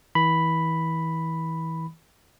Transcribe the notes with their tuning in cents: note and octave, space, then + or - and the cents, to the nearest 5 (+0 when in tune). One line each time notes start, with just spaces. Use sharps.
E3 -30 B5 +0